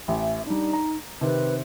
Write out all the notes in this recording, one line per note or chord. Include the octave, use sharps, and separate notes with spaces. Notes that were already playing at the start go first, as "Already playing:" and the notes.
A1 E5
G3 D4 D#4
A#5
C3 D#3 C4 B4